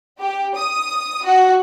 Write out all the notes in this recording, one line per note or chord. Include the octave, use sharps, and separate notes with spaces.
G4
D#6
F#4